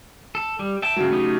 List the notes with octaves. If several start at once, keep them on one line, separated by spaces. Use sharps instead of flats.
A4
G3
E5 G5 A5
C#3 F#3
A3 D#4 G4